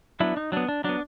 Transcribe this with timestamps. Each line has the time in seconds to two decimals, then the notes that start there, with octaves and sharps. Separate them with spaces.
0.20 F#3 B3 D4 E4
0.37 D#4
0.52 F#3 B3 D4
0.69 D4
0.84 F#3 B3 D4